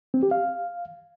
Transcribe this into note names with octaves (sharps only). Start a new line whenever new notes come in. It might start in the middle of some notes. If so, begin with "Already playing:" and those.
C4
G4
F5